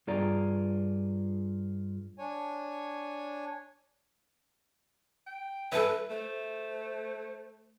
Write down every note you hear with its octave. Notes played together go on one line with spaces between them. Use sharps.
G2 F4 G#4 D5 A#5
D4 C#5 G#5
G5
E4 A4 B4
A3 C5